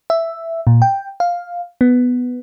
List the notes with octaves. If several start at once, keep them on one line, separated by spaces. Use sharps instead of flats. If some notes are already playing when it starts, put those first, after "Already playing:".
E5
A#2
G5
F5
B3